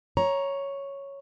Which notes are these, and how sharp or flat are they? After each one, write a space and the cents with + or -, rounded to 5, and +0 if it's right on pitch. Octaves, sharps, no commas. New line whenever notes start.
C#5 +0 A#5 +10